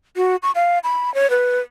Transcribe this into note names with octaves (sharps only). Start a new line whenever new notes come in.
F#4
C#6
F5
B5
C#5
B4